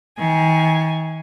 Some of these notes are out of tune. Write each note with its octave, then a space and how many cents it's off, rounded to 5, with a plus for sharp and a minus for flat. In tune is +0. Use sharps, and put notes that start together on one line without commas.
D#3 +45 G#5 +5